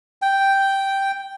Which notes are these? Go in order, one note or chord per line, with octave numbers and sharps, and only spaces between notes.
G5